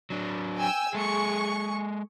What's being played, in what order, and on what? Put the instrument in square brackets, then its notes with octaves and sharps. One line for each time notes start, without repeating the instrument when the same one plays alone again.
[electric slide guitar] F#3 D4
[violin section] G5 G#5 E6
[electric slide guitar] G#3 A4 [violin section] G#4 C#6